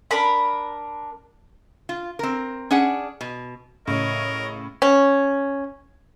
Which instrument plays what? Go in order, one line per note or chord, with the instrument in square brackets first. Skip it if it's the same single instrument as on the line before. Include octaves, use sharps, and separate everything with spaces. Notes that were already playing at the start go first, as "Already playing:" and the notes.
[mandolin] D4 A#4 B5
[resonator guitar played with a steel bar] F4
C4 A#4
C#4 D4 G#4 F#5
B2
[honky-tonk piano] A2 C#3 [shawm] A#4 [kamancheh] C#5 D#5
[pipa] C#4